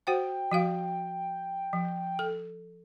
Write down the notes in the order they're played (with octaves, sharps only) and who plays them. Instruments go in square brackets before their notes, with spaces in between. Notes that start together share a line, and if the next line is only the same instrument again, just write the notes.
[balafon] F#4 C5 F#5 [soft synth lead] G5
[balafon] F3 F#4 F5
F3
A4